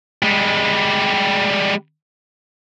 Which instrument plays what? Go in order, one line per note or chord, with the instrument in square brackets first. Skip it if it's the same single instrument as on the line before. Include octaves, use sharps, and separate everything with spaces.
[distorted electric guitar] G3 G#3